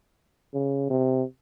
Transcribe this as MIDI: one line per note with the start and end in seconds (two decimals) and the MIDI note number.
0.54 0.88 49
0.90 1.23 48